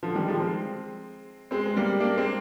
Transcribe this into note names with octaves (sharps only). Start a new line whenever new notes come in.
D3 F3
D#3 G3
F3 G#3
G#3 C4
G#3 C4
G#3
G3 A#3
A#3 D4
G#3 C4